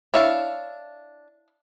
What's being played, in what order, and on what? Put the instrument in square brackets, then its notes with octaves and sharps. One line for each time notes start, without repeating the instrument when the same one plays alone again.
[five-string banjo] D4 E5 A5 [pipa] E4 C#5 F5